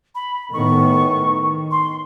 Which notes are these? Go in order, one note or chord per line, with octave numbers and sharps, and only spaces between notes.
B5
A2 D#3 B3 C#6
D#3
C6